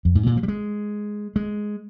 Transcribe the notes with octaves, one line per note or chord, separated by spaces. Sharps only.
F2
G#2
A#2
F3
G3
G#3
G#3